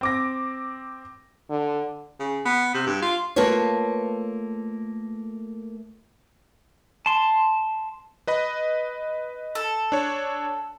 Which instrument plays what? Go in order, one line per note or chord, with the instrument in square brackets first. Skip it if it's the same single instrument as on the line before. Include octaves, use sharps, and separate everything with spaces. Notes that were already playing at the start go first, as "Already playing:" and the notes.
[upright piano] C4 D6 A#6
[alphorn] D3
[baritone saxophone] C#3
B3
C3
G2
F4
[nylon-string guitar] A3 A#3 F4 A4 B4 C#5
[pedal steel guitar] A5 C6
[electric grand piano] B4 D#5 B5
[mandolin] A4
[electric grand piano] D4 C#5